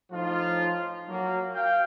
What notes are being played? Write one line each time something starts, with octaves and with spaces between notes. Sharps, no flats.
A2 F3 D#4 F4
F#3 A#3
F5 G5